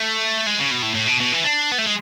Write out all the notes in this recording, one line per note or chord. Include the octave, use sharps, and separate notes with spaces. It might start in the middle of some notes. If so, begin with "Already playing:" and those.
Already playing: A3
G#3
C#3
B2
A2
A2
B2
B2
E3
D4
B3
A3
G#3